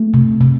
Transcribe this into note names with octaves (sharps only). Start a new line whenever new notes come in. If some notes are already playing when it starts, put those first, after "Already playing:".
Already playing: A3
C3
C3